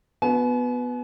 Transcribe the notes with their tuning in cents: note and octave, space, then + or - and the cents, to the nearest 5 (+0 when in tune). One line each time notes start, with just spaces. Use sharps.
B3 +0 F#4 -25 G#5 +45